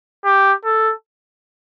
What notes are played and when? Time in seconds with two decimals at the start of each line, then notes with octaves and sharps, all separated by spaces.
0.25 G4
0.65 A4